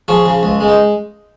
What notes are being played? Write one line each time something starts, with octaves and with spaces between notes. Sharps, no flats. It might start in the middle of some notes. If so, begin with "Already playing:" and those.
F3 G#4 C#5
C#3
C#2
G#3
D#4